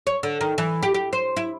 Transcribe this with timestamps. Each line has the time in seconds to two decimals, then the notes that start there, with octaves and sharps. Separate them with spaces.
0.07 C#5
0.23 D3
0.41 D#3
0.58 E3
0.83 G4
0.94 G4
1.13 C5
1.36 E4